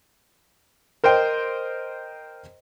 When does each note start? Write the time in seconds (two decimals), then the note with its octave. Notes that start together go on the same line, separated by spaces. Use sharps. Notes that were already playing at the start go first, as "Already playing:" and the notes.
1.04 A#4 C5 D#5 G5